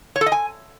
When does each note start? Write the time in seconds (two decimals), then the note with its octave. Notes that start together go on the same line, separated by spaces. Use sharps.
0.16 C#5
0.21 A4
0.26 D#5
0.32 G#5